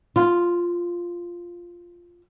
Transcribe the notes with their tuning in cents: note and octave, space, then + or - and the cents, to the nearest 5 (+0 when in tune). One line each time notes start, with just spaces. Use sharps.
F4 +0